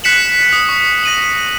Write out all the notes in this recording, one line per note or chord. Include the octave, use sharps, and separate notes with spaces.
F#6 B6 C#7 E7 F#7
D#6
C#6
A#6 D#7 F#7